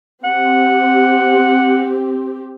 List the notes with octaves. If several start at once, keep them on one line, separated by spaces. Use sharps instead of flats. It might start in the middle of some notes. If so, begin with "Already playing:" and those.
C4 G4 F#5